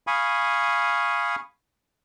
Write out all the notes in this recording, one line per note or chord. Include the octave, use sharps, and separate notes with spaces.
F5 G#5 B5 C#6 D#6